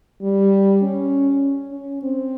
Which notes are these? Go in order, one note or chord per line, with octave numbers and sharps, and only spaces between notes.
G3
C#4
C#4
C4